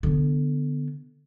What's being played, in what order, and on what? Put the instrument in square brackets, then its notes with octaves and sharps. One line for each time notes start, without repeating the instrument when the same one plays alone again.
[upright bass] D3 B3